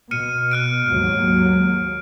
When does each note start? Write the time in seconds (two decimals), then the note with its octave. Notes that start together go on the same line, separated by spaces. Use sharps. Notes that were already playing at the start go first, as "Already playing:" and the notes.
0.11 B2 F6 C#7 D#7
0.51 F6 F#6 D7
0.89 D#2 G#2 F#3